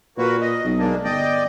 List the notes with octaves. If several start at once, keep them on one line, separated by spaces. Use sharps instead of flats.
A#2 A#3 F#4 B4
D#5
B1
G#2 A#3 D4
G1 D5 D#5 G5